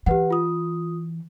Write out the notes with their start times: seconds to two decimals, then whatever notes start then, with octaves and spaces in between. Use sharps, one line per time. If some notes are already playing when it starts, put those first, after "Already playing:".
0.06 E3 G4 B4 F#5
0.30 F4 D#6